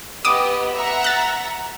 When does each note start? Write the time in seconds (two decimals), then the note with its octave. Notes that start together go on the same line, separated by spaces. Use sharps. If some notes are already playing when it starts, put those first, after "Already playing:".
0.25 B3 G4 D#5 D6 D#6
0.72 E5 F#5 A#5
1.04 F#6 A6